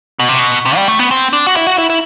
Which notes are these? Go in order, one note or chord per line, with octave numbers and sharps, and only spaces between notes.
B2
C3
B2
C3
G3
A3
B3
C4
D4
F#4
E4
F#4
E4
E4